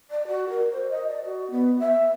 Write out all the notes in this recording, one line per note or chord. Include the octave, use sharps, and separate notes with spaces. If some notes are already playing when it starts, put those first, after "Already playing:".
D5
F#4
A#4
C5
D#5
D5
F#4
B3
E5